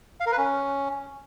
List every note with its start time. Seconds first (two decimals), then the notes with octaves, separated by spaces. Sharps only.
0.20 F5
0.26 A#4
0.32 B4
0.38 C#4